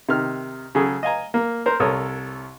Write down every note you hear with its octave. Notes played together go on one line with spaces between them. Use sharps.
C3 D#3 F6
C#3 F#3 G#4 A4
D#5 F5 G#5 A#5
A#3
A#4 C5
C2 A4 A#4 C#5 D#6